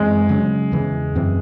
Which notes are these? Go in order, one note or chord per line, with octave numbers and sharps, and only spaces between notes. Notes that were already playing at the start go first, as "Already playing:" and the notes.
Already playing: F#2 E3 G#3 C4
C#3 F#3 C#4
E2 C#3 E3
F#2 E3 C4